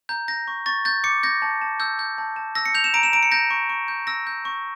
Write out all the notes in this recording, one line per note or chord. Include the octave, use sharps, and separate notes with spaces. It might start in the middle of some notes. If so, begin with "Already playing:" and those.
A#5 G6
G6 A#6
C#6
C#6 A6
G6 A6
D6 C#7
G6 A#6
A5
A5
E6 G6
G6
A5
A5
E6 A#6
C#7
G6 F7
E7
A#5 D7
E7
A#5 D7
C#7
G6 A#6
C#6
C#6
G6
E6 A#6
G6
C#6